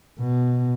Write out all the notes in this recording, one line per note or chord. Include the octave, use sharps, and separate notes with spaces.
B2